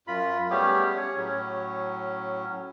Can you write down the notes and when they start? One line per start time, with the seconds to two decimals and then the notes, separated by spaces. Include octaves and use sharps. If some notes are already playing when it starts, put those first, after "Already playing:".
0.07 F#2 F4 B5
0.50 G3 A3 B3 C#4 G4 G#4
0.97 G#4 C#5
1.16 A2 F#3 C#4